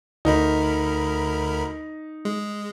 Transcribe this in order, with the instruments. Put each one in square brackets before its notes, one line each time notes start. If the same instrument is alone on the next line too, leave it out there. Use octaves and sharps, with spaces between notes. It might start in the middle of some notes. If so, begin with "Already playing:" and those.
[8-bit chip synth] D2 A#4 B5 [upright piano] D#4
[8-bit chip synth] G#3